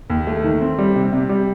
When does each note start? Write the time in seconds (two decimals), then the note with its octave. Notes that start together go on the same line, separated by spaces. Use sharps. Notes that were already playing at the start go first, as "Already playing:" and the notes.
0.10 D#2
0.27 A3
0.44 D#3
0.61 C4
0.78 G3
0.95 C3
1.13 C3
1.29 G3